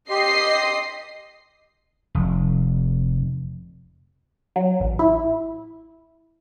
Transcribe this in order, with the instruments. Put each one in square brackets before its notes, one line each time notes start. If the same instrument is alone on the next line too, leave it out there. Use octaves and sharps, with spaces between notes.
[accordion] G4 C6 [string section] D#5 C7
[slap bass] F1
[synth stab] F#3
A1
E4